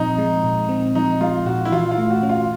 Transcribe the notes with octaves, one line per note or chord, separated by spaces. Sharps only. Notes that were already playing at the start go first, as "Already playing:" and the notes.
Already playing: A#2 F3 C4 D#4
G#3
A#2
C4
F3 D#4
G#3 F4
A#2 F#4
E4
E3 F4
F4
A3
F#4
C#4
F4